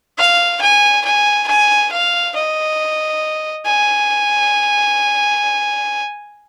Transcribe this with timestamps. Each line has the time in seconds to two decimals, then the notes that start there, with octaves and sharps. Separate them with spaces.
0.18 F5
0.61 G#5
1.05 G#5
1.48 G#5
1.92 F5
2.35 D#5
3.66 G#5